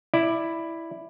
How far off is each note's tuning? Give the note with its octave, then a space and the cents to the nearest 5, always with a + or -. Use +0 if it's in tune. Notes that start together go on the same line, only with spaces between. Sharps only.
E4 +0 D5 +15